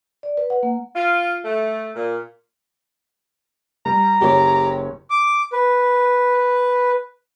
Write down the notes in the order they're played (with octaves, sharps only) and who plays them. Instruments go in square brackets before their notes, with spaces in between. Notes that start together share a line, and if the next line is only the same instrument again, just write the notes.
[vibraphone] D5
B4
F#5
A#3
[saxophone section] F4
A3
A#2
[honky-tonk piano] G3 [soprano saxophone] A#5
[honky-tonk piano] F#1 C#5 [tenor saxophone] G4
[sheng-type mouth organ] D6
B4